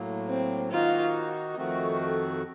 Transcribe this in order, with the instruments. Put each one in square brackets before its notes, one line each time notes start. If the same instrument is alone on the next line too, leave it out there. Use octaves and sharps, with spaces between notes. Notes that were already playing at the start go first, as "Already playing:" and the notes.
Already playing: [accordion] A2 F#3 A#3
[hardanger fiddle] C4
[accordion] D#3 A#3 D#4 F#4 [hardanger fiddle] F4
[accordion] F2 D#3 A3 C4 F#4